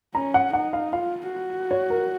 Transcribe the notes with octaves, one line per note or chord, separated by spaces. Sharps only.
C#4 A#5
F#5
D#4 F#5
F5
F4 F5
F#4
C#5
A#4